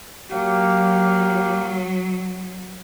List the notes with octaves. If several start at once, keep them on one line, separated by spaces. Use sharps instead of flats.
F#3 A#3 G4 F5